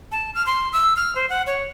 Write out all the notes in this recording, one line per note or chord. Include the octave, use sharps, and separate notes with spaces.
A5
F6
C6
E6
F6
C5
F#5
C#5